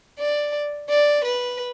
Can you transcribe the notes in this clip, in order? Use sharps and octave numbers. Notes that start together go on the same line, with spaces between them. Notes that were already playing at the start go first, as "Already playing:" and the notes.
D5
D5
B4